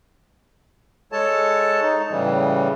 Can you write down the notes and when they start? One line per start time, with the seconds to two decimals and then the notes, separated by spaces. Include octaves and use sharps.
1.12 G#3 A4 C#5 A5
1.82 D#4
2.10 A2 C#3 E3 G3